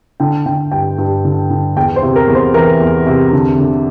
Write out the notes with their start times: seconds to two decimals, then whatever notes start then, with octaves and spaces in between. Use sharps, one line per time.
0.20 D3 G5
0.46 D3 G5
0.72 G2 G5
0.98 G2
1.25 D3
1.50 D3
1.76 E2 G5
1.96 C5
2.03 C3
2.16 A#4
2.28 E2
2.35 C5
2.54 E3 A#4
2.80 E2
3.07 C3
3.32 D3
3.58 D3